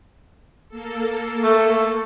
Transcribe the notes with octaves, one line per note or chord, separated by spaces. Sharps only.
A#3 A4
A3